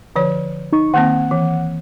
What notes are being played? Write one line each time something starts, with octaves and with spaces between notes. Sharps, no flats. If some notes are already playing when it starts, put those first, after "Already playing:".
D3 F3 C#5
D#4 C#6
D#3 A#3 C4 F#5
E3